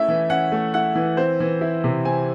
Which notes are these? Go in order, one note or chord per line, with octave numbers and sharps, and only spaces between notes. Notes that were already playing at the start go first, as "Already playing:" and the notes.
Already playing: A3 C#4 E4 E5
E3
C#4 F#5
A3
E4 F#5
E3
C4 C5
E3
E4
C3
C4 G#5